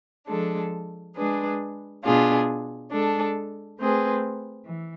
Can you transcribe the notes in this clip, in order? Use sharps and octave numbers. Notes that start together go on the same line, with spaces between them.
F3 G#3 D4 A4
G#3 D4 G#4 B4
B2 B3 D4 F4 G#4
G#3 D4 A4
A3 C4 G#4 B4
E3